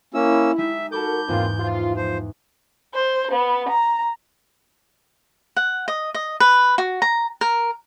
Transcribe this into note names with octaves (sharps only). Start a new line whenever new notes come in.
A#3 C#4 E4 E6
G#3 D#4 G4 E5
F#4 A4 A#4 A5 B5 D6 G6
E2 G#2 A#3 C4 F4
F3 D#4 F4
F3 C5
C5
B3
A#5
F#5
D#5
D#5
B4
F#4
A#5
A#4